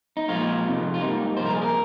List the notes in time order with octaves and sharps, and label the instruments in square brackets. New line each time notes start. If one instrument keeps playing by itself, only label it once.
[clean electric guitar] D#4
A#2 F3 G#3 F4
F2 C3 D#3
F4
G#2 G3 A#3 D#4
C2 A#2 F3 A#3 C5
A#4
G#4
A#4